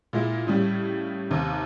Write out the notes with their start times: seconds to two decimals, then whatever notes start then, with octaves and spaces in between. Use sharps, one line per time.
0.13 A#2 G#3 E4
0.47 A2 C#3 G3
1.30 D#2 C3